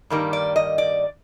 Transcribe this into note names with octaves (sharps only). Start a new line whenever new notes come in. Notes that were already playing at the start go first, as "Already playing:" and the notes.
G2 D#3 G3 A#3
D5
D#5
D5